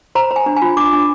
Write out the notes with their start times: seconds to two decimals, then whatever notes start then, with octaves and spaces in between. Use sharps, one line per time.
0.15 C5 A#5
0.31 C5
0.36 G#5
0.46 D4
0.57 G#5
0.62 F4
0.77 D4 D6
0.93 D4